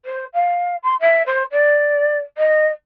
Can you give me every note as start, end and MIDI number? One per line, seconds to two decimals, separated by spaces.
0.05 0.25 72
0.34 0.76 77
0.83 0.95 84
1.00 1.23 76
1.26 1.44 72
1.52 2.18 74
2.38 2.68 75